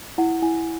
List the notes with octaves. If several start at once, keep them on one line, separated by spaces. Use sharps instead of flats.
E4 F#5
E4 G#5